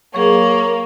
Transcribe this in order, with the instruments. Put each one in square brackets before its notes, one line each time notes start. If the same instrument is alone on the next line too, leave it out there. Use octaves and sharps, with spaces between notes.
[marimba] F#3 G#4 [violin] A#3 [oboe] C#5